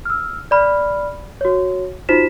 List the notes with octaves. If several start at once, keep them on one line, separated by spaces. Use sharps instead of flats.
E6 F6
D5 B5 F6
F#4 C#5
D#4 F4 F#4 C5 B6 E7